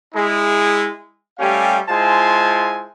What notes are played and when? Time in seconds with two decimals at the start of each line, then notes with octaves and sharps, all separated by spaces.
0.15 G#3 E4 G#4
1.39 G3 A3 C#4 G4 F5 G#5
1.89 G#3 E4 F4 C5 G#5 A5